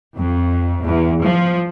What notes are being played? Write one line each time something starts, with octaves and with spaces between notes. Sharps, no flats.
F2
E2
F3